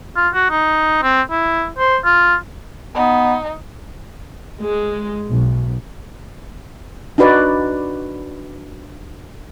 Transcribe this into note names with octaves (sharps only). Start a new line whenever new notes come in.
F4
F#4
D#4
C4
E4
C5
F4
B3 D#4
G#3
B1
D4 D#4 F#4 B4 D5